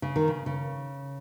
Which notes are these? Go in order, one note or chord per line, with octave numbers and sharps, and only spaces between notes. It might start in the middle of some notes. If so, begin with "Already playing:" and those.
C#3
D#3
C#3
C#3